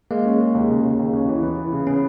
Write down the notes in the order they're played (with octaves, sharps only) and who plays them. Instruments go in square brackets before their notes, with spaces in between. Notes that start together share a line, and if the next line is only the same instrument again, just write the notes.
[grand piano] G#3 [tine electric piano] A#3
[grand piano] C#4
G#3
D#2
C#3
C#3
D#2
C#4
E3
B3
E3
C#3
[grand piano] B3 [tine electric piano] C#4